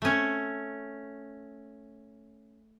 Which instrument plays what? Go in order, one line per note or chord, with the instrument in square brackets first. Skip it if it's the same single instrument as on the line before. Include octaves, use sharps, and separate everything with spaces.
[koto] A3 C#4